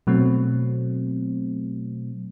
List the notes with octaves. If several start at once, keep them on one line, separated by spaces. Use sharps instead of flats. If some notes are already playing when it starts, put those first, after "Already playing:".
B2 F#3 A3 C4